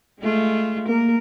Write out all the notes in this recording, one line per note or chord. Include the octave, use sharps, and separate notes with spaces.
G#3 A3 F4
A#3 A#4